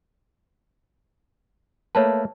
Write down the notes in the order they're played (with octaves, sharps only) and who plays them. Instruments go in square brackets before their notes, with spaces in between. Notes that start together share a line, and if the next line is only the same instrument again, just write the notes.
[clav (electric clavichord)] A3 A#3 B4 [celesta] C#5 A5